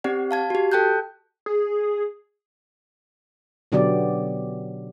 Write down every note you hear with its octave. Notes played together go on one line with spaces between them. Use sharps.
C4 G4 D5 F#5
F5 A5 G#6
F#4 G4
A4 G5 A5 F#6 G6
G#4
B2 D3 F#3 B3 G4 D5